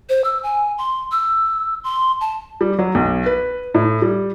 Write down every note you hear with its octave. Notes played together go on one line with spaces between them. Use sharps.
C5
E6
G#5
C6
E6
C6
A5
G3
F#3
B1
B4
A2
G3